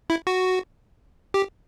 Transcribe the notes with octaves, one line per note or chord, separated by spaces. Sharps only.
E4
F#4
G4